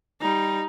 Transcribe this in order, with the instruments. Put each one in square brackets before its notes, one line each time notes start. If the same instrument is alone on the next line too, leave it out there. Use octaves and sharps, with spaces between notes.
[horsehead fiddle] G3 [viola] D#4